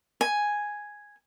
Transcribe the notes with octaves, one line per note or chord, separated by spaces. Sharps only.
G#5